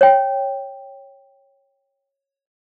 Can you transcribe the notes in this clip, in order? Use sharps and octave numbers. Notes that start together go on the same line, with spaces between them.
C#5 G5